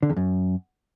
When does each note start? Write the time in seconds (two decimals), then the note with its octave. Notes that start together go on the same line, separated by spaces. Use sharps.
0.02 D3
0.10 E2
0.17 F#2